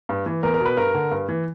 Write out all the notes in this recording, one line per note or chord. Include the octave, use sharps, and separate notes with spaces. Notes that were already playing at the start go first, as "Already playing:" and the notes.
G2
E3
E2 A#4
A#4
B2 B4
G2 A#4
D3
G2
E3